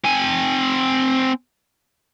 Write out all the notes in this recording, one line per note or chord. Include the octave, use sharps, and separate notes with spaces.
C4 G#5